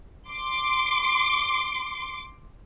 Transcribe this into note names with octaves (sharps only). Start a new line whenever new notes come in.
C6 D6